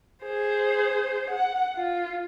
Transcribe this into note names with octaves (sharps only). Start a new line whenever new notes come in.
G#4 C5
F#5
F4